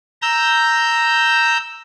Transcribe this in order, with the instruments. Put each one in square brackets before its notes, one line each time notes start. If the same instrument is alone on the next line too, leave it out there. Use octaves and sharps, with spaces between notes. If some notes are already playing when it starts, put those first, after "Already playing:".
[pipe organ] A#5 E6 G6